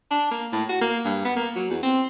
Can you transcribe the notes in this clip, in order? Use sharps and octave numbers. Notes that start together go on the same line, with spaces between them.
D4
A#3
A2
F#4
A#3
G2
B3
A#3
F#3
E2
C4